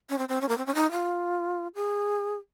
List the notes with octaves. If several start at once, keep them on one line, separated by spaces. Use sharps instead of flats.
C#4
C4
C4
C#4
A#3
C4
C#4
D#4
F4
G#4